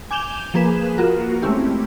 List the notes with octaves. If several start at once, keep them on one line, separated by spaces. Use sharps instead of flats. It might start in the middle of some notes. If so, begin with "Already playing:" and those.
G#5 D6 G6 E7 F7 G7
F3 A#3 G#4 B4 E7
A#3 F4 F#4 A#4
G#3 A3 C4 C#4 E4 G4